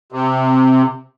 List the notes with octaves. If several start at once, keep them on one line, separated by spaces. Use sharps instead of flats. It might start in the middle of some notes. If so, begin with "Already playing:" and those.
C3